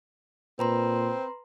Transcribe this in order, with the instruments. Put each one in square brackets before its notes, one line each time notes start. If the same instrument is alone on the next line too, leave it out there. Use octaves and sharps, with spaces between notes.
[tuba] A#2 [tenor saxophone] C4 [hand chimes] B4 A#5 C6